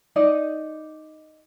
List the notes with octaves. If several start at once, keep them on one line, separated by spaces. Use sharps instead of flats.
D#4 D5 D#5